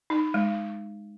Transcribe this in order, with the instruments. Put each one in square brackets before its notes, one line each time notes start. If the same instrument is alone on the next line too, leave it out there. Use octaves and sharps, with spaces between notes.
[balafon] D#4
G#3